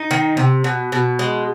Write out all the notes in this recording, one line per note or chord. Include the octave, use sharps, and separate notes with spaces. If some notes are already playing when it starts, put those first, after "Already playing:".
Already playing: D#4
D#3
C3
B2
B2
G#3